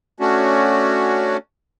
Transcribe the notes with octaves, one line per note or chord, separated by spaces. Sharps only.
A3 C#4 D4 F#4